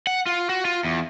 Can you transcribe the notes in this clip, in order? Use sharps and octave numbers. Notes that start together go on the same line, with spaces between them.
F#5
F4
F#4
F4
E2